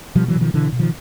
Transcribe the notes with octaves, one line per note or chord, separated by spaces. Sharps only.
B2 F3 G3
E3 F#3
B2
D#3 F3
B2 D3 E3
B2
D#3 F3